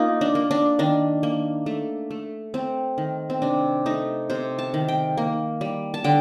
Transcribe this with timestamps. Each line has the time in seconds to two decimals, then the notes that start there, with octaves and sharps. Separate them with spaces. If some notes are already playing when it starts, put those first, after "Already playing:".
Already playing: A#3 D#4 F4
0.21 D4
0.35 A#3
0.51 D4
0.79 D#3 D4
1.23 A#3
1.66 A3
2.11 A3
2.54 A3 C4
2.98 D#3
3.30 C4
3.42 C3 D4
3.86 A3 D#4
4.30 C3 C5
4.59 A5
4.74 D#3
4.88 G5
5.17 A#3
5.61 G3
5.94 A5
6.04 D3 G5